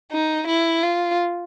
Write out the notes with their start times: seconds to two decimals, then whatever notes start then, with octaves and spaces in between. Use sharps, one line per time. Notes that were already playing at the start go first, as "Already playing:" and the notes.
0.11 D#4
0.47 E4
0.83 F4